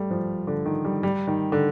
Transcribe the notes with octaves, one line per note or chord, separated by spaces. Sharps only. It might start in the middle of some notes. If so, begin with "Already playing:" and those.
Already playing: G3 A3
F3
D3
D#3
G3
G3
D#3
D3